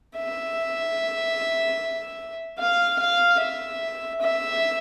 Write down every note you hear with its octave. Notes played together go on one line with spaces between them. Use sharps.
E5
F5
F5
E5
E5